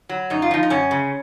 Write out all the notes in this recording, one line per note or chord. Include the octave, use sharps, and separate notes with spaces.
F#3
F#2 D#4
F4
F3 D#4
D#4
F#2 C#4
C#3